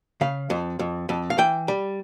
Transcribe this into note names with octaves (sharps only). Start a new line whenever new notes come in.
C#3 F5
F2
F2
F2
F5
E3 G5
G3